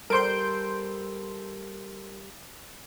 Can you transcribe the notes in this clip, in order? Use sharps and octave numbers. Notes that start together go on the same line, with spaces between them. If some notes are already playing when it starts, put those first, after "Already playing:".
G3 A4 A#4 C5 C6 G6 D7